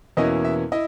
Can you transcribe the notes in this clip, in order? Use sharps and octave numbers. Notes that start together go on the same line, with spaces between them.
E2 B2 A#3 C#4 E4 D#5
E5
E4 D#5